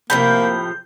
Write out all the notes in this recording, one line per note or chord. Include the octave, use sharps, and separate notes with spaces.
A2 C3 F3 A#3 E4 F#4 B5 G6